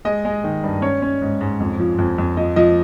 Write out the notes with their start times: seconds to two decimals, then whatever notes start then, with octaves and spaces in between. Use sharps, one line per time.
0.05 G#3 D#5
0.25 G#3
0.44 D#3
0.64 G2
0.82 C#4 C#5
1.02 C#4
1.22 G#2
1.41 G#2
1.60 F2
1.79 F3
1.98 F2
2.18 F2
2.37 F3 D#5
2.56 F3 D#5